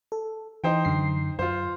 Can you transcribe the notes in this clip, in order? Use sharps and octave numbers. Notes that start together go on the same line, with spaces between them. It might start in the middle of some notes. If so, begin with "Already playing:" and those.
A4
E3 D#4 C5 G5
F#2 D3 C7
F#2 F4 C5